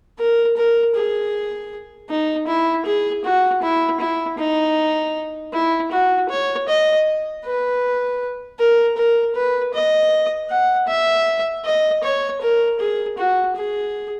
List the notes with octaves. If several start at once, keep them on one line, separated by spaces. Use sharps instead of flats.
A#4
A#4
G#4
D#4
E4
G#4
F#4
E4
E4
D#4
E4
F#4
C#5
D#5
B4
A#4
A#4
B4
D#5
F#5
E5
D#5
C#5
A#4
G#4
F#4
G#4